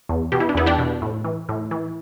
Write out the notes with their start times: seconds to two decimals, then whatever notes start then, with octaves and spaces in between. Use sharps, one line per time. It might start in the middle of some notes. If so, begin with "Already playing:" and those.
0.09 E2
0.32 B2 G4
0.40 E4
0.49 D4
0.55 E2 B3 E4
0.66 D4 G4
0.79 B2
1.02 A2
1.24 E3
1.49 A2
1.71 E3